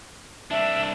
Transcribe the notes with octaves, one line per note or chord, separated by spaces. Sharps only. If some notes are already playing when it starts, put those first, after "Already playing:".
C2 D4 E5